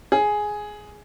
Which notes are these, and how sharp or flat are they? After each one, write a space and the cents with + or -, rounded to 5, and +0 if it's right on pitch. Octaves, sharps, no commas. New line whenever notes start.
G#4 +5